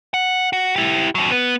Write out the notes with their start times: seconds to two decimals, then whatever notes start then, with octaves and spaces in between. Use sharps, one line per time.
0.14 F#5
0.53 F#4
0.76 E4 G4
1.15 D#2 F#3
1.31 B3